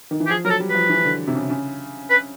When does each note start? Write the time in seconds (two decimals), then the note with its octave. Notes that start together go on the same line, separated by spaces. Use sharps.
0.11 D#3
0.20 E3
0.26 G4
0.29 F3 G#4
0.45 F#3 A#4
0.50 A4
0.60 G3
0.70 F3 B4
0.89 E3
1.04 D3
1.27 C3
1.35 C#3
1.50 C#3
2.10 B4